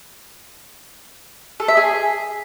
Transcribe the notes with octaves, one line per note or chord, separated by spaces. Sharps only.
A4
E5
G#4